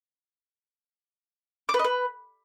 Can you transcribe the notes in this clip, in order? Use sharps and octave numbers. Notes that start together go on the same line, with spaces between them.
D6
B4
D#5
B4